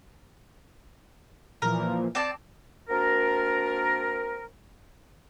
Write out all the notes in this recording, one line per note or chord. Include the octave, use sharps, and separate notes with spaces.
A#2 E3 F3 A#4
C4 D5 A5
A#3 C4 D4 F#4 A#4